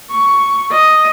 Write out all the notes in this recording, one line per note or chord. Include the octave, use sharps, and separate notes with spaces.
C#6
D#5